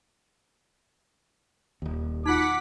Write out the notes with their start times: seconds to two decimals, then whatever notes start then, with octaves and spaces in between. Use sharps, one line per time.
1.82 D#1 D#2
2.26 D#4 F4 F#5 D6 B6